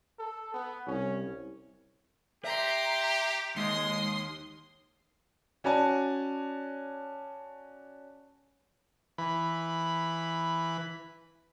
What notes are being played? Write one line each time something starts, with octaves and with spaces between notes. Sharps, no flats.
A4
B3
C2 C#4
G4 E5 A#5 C6
D#2 G#3 C6 D#6
C#4 F#4 D5 G#5 A5
E3 B5